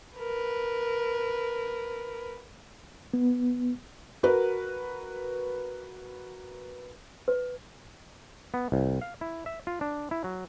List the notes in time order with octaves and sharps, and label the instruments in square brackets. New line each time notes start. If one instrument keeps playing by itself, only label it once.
[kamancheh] A#4 B4
[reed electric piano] B3
[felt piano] F#4 A#4 B4
[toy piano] B4
[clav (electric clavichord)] B3
C2
F5
E4
E5
F4
D4
E4
F#3